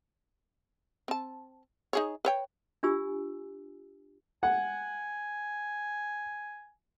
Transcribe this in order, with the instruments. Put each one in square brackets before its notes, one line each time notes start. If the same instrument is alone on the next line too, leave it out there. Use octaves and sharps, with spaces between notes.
[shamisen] C4 A5
D#4 G#4 C#5
B4 C#5 G5
[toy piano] D4 F4 G4 G#5 E6
[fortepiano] F#5 [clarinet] G#5